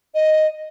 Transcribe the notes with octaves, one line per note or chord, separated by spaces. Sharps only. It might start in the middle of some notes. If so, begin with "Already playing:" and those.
D#5